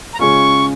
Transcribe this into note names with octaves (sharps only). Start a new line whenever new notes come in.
A#5
C#3 G#3 C#4 F4 C#6